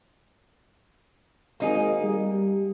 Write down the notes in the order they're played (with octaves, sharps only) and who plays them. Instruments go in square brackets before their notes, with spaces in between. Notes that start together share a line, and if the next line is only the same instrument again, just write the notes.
[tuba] G#1 [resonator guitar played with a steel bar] A#3 D#4 G#4
[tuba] G3